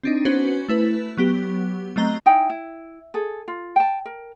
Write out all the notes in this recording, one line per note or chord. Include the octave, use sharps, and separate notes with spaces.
C4 D4 D#4
B3 C#4 F#4 B4 C5
A3 E4 B4
F#3 B3 G4
F#3 A3 C4 D#5 A#5 G7
D#4 E4 G5 G#5
E4
G#4 A4
F4
G5 A5
A#4